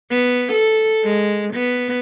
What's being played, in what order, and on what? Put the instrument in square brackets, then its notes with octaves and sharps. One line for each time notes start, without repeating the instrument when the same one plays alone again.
[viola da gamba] B3
A4
G#3
B3